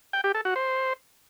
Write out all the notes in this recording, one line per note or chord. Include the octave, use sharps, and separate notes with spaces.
G5
G4
A4
F#4
C5